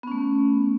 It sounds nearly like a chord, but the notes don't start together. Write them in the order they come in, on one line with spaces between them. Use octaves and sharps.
B3 C#4 A3